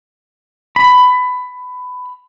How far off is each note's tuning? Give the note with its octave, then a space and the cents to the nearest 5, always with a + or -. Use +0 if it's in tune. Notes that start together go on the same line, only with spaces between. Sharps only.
B5 +20